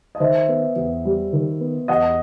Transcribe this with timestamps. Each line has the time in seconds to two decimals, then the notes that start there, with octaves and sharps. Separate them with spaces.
0.15 D#5
0.20 D#3 C5 E5
0.48 B3
0.76 E2
1.05 G3
1.33 D#3
1.60 B3
1.88 E2 D#5 F#5